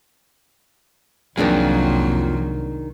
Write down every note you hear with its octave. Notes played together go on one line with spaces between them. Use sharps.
C2 F2 D#3 F#3 A#3 D4 G#4